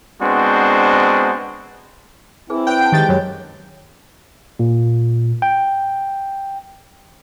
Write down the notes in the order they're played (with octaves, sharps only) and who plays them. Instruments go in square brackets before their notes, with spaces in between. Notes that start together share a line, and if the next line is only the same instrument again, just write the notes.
[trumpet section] G#3 B3 C4 D4 F#4 C5
[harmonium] C4 E4 [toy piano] G#4 B4 G#5
[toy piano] B4 C5 D5 [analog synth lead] G5
[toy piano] F#5 A5
[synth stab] D#3 A6 [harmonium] G#3 G4
[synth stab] F#2 [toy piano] C#5 B5
[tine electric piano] A#2
G5